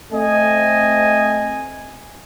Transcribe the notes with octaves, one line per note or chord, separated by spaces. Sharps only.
A3 C4 D#5 G#5